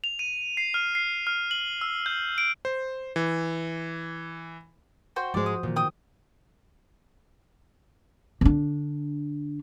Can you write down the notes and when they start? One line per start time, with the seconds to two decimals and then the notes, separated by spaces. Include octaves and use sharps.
0.04 F7
0.19 D#7
0.57 C7
0.74 F6
0.95 C7
1.27 F6
1.51 F#7
1.81 E6
2.06 G6
2.38 D7
2.65 C5
3.16 E3
5.16 F#4 C5 G5
5.34 G#2 F3 G#3 F#4 C5 D5
5.46 D#6
5.63 A#2 D#3 E3
5.76 G5 D#6
8.41 D3 D4